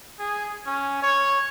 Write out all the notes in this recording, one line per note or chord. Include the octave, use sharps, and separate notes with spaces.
G#4
C#4
C#5